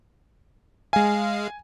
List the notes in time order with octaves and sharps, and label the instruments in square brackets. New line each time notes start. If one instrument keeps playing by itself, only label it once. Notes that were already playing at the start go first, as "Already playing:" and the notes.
[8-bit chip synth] G#3 F5 [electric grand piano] G#5